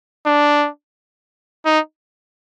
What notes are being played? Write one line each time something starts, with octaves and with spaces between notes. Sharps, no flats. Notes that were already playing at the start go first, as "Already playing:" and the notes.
D4
D#4